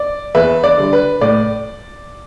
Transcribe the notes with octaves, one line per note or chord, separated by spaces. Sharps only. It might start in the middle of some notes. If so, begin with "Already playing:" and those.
Already playing: D5
E2 B4 E5
D5
D3 G3
B4
A2 D5